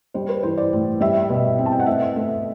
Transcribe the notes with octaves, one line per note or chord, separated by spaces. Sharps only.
G3 C5
B4
E3 C5
D5
A2
G3 E5
B2
C4
A5
G5
F#5
A3 E5
A3